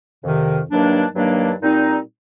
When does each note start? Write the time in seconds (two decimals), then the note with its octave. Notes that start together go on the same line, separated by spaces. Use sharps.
0.24 F2 C3 D#3
0.70 G2 D#3 F#3 A#3 D4
1.16 G2 D#3 F#3 A#3 D4
1.61 A#2 G3 C4 D#4